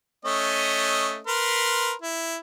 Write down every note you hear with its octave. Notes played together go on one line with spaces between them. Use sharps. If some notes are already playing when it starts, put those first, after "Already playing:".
A3 C#4 D#5
A#4 B4 C6
E4